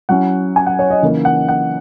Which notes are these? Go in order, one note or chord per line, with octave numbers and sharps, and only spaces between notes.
F#3 C#4 E4 F#5
G#5
F#5
C#5
D#5
C#3 E3 A#3 D#4
F#5
F#5